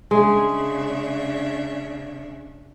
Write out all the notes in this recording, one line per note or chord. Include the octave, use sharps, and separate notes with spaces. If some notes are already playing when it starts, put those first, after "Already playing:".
C#3 G#3 D4 E5